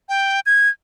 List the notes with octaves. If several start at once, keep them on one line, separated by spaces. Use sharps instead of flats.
G5
G#6